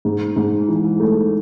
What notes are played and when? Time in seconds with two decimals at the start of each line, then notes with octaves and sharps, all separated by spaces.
0.05 G#2
0.36 G#2
0.68 E3
1.00 A3